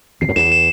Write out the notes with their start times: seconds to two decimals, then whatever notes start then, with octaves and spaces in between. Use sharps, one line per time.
0.21 E2 C7
0.29 F#2
0.36 E2 E7
0.52 E7